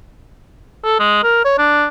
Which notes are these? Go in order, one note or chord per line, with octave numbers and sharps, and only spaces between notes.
A4
G#3
A#4
C#5
D4